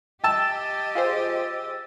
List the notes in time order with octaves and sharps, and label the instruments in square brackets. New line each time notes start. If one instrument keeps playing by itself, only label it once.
[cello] G4 D#5 [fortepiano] G5 A5 [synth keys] E6 A6
[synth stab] F4 G#4 C5